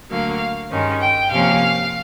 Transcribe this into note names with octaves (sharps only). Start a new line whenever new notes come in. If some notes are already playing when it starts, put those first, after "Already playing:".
D2 D3 F#3 A#3 F5
G2 D#3 G#3 C#4
G5
C3 F3 A#3 C#4 F5